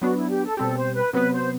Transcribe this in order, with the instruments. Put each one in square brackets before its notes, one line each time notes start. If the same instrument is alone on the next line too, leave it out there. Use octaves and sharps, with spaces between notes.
[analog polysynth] F#3 B3 D4 [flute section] F#4
[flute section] E4
G4
A4
[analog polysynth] B2 G3 C4 G4 [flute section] A4
[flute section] C5
B4
[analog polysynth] C3 F#3 B3 [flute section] B4
[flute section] C5